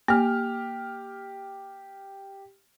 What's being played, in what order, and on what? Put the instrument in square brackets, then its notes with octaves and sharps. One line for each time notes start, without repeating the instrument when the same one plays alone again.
[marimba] A#3 [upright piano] G4 F6